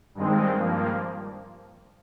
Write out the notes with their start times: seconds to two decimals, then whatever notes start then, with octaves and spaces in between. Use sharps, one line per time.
0.15 G2 D#3 G#3 C4
0.56 G2 F3 A#3